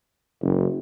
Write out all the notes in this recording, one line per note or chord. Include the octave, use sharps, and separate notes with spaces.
F#1